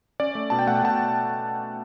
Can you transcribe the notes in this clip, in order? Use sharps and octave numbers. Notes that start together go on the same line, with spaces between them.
C#4 D5
A3
B2 A5
G5
A3 F#5
B2 A5